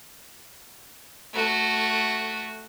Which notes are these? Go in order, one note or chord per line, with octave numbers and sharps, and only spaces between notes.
A3 F#4